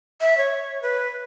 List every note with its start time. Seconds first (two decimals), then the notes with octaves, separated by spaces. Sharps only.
0.21 E5
0.38 C#5
0.82 B4